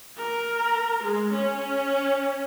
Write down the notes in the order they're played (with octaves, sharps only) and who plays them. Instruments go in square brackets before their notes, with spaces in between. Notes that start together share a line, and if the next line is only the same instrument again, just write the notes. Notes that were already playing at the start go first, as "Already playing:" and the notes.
[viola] A#4
G#3
C#4